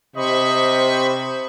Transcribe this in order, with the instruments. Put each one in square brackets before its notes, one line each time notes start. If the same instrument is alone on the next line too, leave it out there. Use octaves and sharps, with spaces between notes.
[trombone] C3 [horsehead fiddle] C5 [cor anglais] D#5 [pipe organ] B5 C#6